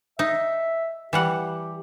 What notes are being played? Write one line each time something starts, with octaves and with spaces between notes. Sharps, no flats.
D#4 E5
E3 G3 G4 F#5